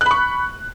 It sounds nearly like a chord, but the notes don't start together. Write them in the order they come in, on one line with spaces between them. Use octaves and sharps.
F#6 B5 C#6